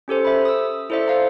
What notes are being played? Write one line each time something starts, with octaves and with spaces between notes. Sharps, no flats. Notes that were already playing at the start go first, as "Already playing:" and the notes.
C#4 G4 A4 C5
E5 B5
D#6 E6
E4 A4 C5 D5 E5
C5 F5 A#5